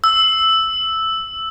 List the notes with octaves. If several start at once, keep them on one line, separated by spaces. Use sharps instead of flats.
E6